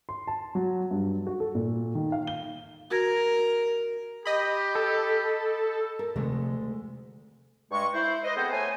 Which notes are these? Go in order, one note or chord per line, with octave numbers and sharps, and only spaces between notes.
C6
A5
F#3
G2
F#4
A4
A#2
D#3
F5
G7
F#4 A#4 G#6 A#6
G4 D#5 B5
A4
A#4
D2 C3 D#3 F3 G#3 A3
G2 G#3 C#6
E4 C5
B4 C5 D#5
B3 C4 G#4 A4 C5
A3 C5 C#5 G#5